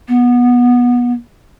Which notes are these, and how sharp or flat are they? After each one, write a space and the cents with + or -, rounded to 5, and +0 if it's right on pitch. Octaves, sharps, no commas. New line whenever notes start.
B3 -20